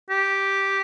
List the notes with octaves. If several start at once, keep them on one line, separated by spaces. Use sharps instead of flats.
G4